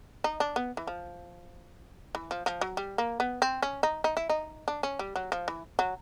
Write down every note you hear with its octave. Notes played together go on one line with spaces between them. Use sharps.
D#4
D4
B3
E3
F3
E3
F3
F3
F#3
G3
A#3
B3
C4
C#4
D#4
D#4
E4
D#4
D4
C#4
G3
F#3
F3
E3
F#3